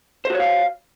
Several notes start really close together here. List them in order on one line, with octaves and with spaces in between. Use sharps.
C5 F#4 C#5 F5